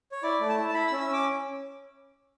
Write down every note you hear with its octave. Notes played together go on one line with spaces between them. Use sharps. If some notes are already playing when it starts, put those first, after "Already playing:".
C#5
E4 D5
A3
A5
E4
A5
E4 B5
E6
C#4
E6
C#4 D6